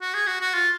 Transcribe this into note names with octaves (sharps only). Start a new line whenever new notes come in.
F#4
G#4
F#4
F#4
F4